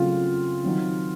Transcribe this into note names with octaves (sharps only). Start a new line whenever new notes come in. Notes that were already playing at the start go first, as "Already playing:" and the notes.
Already playing: C#3 F#3 A3 C4 F4
D#3 F#3 C4